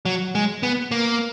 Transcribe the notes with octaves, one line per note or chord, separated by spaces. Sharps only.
F#3
G#3
B3
A#3